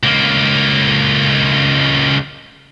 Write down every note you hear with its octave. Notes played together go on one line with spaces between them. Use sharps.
C#2 A#3